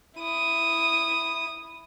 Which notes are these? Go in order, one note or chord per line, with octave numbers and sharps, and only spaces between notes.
E4 D#6